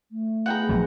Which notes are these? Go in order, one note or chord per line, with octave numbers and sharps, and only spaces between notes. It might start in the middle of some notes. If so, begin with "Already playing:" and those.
A3
B3 E4 G#4 F#5 G5 A#5
A#1 F#3 B3 C4